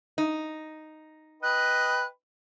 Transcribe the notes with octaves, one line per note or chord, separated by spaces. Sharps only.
D#4
B4 D#5 G5 F#6